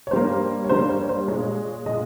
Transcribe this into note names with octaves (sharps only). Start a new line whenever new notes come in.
C#5
G2 G3 A#3 C5
C#5
G2 G3 A#3 C5
C#5
C5
A#2 G#3 C#5
A#2 G#3 D#5